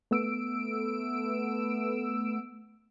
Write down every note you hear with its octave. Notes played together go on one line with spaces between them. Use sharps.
A3 B3 E6 D7